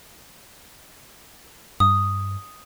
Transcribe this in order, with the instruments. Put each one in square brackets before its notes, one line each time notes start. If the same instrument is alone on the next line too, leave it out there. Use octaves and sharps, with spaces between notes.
[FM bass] G2 [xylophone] D#6